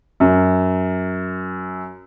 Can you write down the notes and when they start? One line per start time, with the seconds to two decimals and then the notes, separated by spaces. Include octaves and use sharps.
0.20 F#2